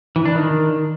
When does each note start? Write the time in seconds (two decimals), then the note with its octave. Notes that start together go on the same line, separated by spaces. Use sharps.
0.16 E3
0.25 D4
0.35 D#3